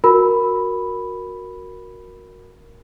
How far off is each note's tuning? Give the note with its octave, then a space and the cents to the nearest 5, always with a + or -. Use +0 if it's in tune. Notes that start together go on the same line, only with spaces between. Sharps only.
F#4 -15 A#4 +0 B5 +0